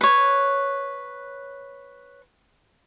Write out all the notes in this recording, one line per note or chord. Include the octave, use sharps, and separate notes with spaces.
B4 C#5